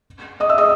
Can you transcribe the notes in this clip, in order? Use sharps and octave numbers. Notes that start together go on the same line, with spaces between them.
D#5 D#6
E5 E6
D#5 D#6